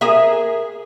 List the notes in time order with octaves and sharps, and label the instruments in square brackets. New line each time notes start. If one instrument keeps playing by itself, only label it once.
[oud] G#4 A#4 E5